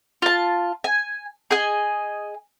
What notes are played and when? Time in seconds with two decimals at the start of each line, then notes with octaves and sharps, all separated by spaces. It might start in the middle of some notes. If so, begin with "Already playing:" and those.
0.22 F4 A5
0.84 G#5
1.51 G#4 D#5 G#5